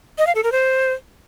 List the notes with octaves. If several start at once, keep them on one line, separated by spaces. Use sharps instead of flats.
D#5
F5
A4
A#4
C5